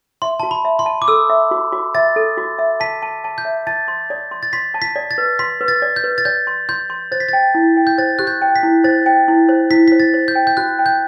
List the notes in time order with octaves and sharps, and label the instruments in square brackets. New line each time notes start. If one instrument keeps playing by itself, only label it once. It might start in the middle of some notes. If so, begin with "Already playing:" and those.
[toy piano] E5 [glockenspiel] C6
[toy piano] F#4 [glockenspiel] A5
[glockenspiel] B5
[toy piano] E5
[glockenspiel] C6
[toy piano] A5
[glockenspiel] D6
[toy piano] A4 [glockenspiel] E6
[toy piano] E5
F#4
F#4
[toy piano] E5 [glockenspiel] A6
[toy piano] A4
F#4
E5
[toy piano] A5 [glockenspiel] B6
[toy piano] A5
A5
[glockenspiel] G6
[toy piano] E5
[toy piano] A5 [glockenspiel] A6
[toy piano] C6
D5
C6
[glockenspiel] A6
[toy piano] C6 [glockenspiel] B6
[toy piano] A5
[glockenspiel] B6
[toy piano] D5
[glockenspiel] A6
[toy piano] B4
[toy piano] C6 [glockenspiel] B6
[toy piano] B4
[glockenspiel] A6
[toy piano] D5
[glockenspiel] G6
[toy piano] B4
[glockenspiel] A6
[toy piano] D5 [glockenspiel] G6
[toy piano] C6
[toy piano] C6 [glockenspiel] G6
[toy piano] C6
[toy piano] C5 [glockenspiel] A6
[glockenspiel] B6
[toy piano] G5 [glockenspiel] A6
[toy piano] E4
G5
[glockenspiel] G6
[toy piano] C5 [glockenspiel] A6
[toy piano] G4 [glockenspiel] F#6
[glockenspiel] G6
[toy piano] G5
[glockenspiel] B6
[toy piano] E4
[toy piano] C5 [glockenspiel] A6
[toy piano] G5
E4
C5
[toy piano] E4 [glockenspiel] B6
[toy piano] C5 [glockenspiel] B6
[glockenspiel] A6
[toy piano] C5
[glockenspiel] G6
[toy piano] G5
[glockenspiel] G6
[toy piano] F#4 [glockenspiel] F#6
[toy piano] G5
[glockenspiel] G6